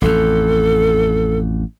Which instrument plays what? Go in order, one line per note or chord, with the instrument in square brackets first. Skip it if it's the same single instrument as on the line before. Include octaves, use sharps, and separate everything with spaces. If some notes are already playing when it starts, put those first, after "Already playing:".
[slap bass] A1 F2 [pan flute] A4